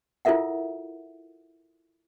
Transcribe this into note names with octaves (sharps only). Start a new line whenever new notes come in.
E4 F4 A4 A#4 E5 F#5